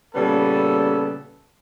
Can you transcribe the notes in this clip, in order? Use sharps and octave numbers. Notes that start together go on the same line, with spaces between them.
A#2 C#3 G3 B3 C#4 A4